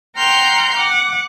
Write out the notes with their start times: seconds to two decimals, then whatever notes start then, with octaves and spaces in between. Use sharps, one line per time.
0.17 F#5 G5 A#5 C6 F6 G6
0.76 F#5 D6